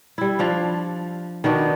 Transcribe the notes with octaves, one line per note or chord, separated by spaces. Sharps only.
G3 E4
F3 D4 F5
D#3 B3 D4 F#4